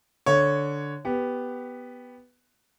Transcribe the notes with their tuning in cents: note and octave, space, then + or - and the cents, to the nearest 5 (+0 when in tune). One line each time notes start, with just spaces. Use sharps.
D3 +0 C#5 +0
B3 +0 G4 +0